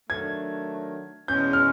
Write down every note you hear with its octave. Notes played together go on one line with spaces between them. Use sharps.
D#3 F#3 A3 D4 G#6
E2 B2 G#3 C#4 G6
F6